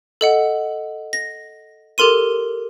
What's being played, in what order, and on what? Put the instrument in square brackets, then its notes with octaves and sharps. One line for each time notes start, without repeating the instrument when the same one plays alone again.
[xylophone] A4 D#5 F#5
A#6
G4 A4 A#4 C6 D#7